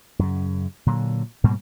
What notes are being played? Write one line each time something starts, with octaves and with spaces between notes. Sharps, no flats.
F#2 C#3
A#2 D3 F#3
G#2 B2 G3 A#3